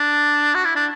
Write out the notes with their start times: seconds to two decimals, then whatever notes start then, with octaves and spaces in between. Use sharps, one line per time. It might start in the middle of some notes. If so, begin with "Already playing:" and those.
Already playing: D4
0.55 F#4
0.65 E4
0.76 D4